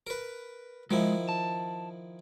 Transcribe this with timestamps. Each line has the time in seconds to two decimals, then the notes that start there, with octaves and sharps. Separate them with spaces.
0.07 A#4 B4
0.91 D#3 F3 G#3 E4
1.29 A5